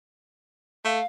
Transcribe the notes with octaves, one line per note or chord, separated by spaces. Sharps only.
A3 F5